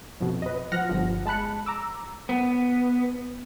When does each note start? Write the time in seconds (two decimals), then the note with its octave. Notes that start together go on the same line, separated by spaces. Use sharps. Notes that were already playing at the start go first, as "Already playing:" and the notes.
0.20 F2 B2
0.42 B4 D#5
0.72 F3 F#5 F6 A#6
0.89 G1 F3
1.26 G#3 A5 B5 F#6 C#7
1.66 A#5 D6 E6
2.29 B3